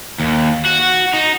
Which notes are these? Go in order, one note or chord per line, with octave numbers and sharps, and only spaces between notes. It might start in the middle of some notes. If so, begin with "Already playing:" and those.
D#2
F#4
D#4